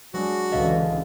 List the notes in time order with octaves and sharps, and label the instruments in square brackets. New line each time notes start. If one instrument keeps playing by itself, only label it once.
[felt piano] F#3 G#3 D4 [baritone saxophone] F#4
[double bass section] C#2 D3 E3 [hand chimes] D#5 F5